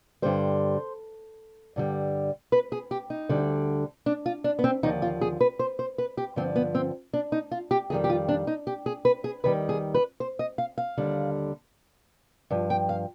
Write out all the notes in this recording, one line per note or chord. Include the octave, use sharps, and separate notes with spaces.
G2 D3 G3 C5
G2 D3 G3
B4
G#4
G4
D#4
D2 D3 G3
D4
F4
D4
B3
C4
D#2 D3 F3 D#4
F4
G#4
B4
C5
C5
B4
G4
G2 D3 F3 C4
B3
C4
D4
D#4
F4
G4
F2 D#3 G3 G#4
G4
F4
D4
D#4
G4
G#4
B4
G#4
D#2 D#3 G3 B4
G#4
B4
C5
D#5
F5
F5
D#2 D3 G3
G2 F3
G5
F5